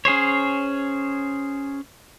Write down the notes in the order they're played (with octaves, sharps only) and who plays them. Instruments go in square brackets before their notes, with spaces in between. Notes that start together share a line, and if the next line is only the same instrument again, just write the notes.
[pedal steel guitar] C#4 G#4 C5 C#5